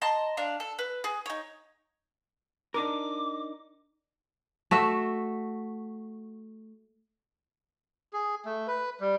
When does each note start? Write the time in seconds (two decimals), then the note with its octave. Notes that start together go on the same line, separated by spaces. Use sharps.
0.02 D#5 A5 A#5 C6
0.37 D4 F5
0.60 A4
0.79 B4
1.04 G#4
1.26 D#4 C#5
2.74 D4 D#4 A#4 D6
4.71 A3 F#4 E5
8.13 G#4
8.45 A3
8.67 B4
9.00 G3